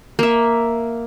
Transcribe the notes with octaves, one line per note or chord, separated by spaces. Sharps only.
A#3 E5